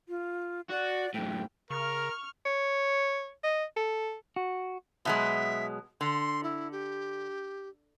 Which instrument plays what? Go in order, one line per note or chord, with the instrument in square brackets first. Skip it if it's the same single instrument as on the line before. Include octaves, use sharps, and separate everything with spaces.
[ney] F4
[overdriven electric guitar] F#4 [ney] D5
[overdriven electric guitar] F#2 A2 [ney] G5
[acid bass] C#3 [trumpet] A#4 [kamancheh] C#6 F6
[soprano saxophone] C#5
D#5
A4
[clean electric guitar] F#4
[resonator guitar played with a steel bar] B2 F#3 G#3 [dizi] E5
[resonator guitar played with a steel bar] D3 [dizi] C6
[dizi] E4
G4